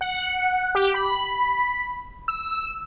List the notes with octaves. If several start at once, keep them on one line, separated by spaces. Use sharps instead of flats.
F#5
G4
B5
E6